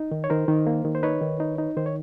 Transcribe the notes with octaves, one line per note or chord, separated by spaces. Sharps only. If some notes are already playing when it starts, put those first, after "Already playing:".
Already playing: D#4
D#3
C#5
D#3 A#4 C5
D#3
A#3
D#3
C5
D#4 B4 C#5
D#3
D#4
D#4
D#3 C5
C#5